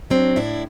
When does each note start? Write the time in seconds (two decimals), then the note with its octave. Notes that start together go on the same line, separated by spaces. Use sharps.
0.10 F#3 C4 D4
0.36 A2 D4 E4